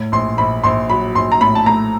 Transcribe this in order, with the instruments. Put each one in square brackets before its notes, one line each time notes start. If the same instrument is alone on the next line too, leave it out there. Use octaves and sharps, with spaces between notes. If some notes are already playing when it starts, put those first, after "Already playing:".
Already playing: [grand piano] A2
[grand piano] A#1 [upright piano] C6
[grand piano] A#1 [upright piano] B5
[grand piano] A#1 [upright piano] C6
[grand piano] F#3 [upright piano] B5
[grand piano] A#1 [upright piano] C6
[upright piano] A#5
[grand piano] A2 [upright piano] B5
[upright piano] A5
[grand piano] A3 [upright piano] A#5